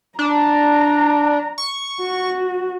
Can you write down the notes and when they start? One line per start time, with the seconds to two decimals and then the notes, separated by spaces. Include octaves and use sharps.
0.19 D4 A#5
1.58 C#6
2.01 F#4